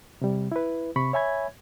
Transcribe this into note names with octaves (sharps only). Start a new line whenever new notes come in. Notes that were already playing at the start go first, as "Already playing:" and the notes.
C3 G3
E4 B4
C3 B5 C#6
C#5 E5 G#5 B5 G#6